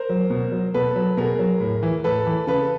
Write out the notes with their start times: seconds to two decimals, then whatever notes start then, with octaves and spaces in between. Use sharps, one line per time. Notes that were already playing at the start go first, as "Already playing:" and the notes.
Already playing: A#4 C5
0.09 F#3
0.30 B2
0.52 F#3
0.74 B2 A4 B4
0.96 F#3
1.17 B2 G#4 A#4
1.39 F#3
1.60 A2
1.83 E3
2.04 A2 A4 B4
2.27 E3
2.47 C#3 A4 B4